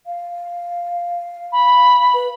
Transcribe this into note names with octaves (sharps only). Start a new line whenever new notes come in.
F5
B5
B4